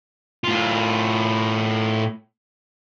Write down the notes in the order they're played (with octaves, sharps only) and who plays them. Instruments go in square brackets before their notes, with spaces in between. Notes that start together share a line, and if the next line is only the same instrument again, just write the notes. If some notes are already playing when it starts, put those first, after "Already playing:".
[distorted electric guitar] A2 F4